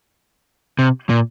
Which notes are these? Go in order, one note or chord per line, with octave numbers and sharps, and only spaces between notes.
C3
A#2